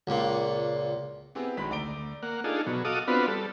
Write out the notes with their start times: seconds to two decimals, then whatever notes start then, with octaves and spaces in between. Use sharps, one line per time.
0.07 C#2 A#2
1.35 B3 C4 E4 G4 G#4 B4
1.57 A#1 D#3 F#3 G#3 B5 B6
1.70 D2 D5 A#5 D7 G7
2.23 A#3 F#5
2.44 D4 D#4 F4 G#4 A4
2.67 B2 F#3
2.85 F#4 A4 D#5 F5 D6 D#6
3.08 B3 C4 D4 F4 F#4 B4
3.28 G3 A4